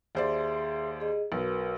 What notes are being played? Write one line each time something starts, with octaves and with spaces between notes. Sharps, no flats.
D#2 G#4 C5 D5 E5 C6
G#4 D#5
B1 F#4 A#4 B4